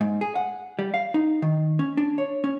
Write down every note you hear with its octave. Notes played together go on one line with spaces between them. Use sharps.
G#2
G#4
F#5
G3
F5
D#4
D#3
C#4
D4
C#5
C#4